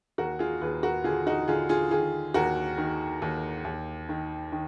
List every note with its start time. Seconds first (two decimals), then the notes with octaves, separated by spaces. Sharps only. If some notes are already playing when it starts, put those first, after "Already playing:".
0.18 D#2 F#4 A#4
0.39 F4 G#4
0.61 D#2 G#4 B4
0.83 F#4 A#4
1.04 D3 F4 G#4
1.27 D#4 F#4
1.48 D3 F4 G#4
1.69 F4 G#4
1.91 D#3 F4 G#4
2.34 D#2 F#4 A#4
2.78 D#3
3.22 D#2
3.65 D#2
4.09 D#3
4.52 D#3